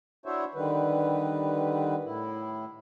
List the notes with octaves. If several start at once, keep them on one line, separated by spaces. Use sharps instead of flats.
D4 E4 F#4 C5 C#5 E5
D3 D#3 G3 B4
A2 E4